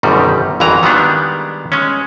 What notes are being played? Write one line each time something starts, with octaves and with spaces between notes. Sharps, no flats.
G1 F#2 B2 D#3 G3
G#1 F2 G#2 E3 A#5
D#3 G3 G#3 B3 D4
G#3 C#4